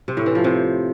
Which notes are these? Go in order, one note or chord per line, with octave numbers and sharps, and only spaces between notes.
C3
A2
E3
F3
C3